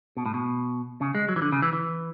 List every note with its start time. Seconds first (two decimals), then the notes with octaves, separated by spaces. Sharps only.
0.17 B2
0.26 A2
0.34 B2
1.01 C#3
1.15 G#3
1.29 F#3
1.36 E3
1.42 D3
1.52 C#3
1.62 E3
1.73 E3